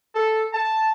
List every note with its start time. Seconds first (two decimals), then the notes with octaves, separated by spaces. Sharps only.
0.15 A4
0.54 A5